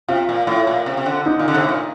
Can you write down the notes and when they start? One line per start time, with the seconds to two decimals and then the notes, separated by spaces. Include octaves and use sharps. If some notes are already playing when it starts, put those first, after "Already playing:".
0.08 C3 F4
0.29 A#2
0.47 A2
0.67 A#2
0.86 C3
0.97 C3
1.06 D3
1.25 D3 D#4
1.39 A#2
1.48 D3
1.54 C3
1.64 A2
1.69 A#2